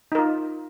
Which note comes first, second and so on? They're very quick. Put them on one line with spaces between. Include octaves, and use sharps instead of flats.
D#4 A#4 F4